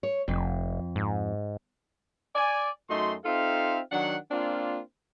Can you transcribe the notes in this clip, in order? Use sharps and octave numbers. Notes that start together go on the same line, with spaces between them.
C#5
F1 F2
G#2
D5 G#5
F#2 A3 D#4 F#4 C6
C4 D#4 F4 A4 E5 F5
D#3 F#3 D4 F#5
A#3 C4 D4 F4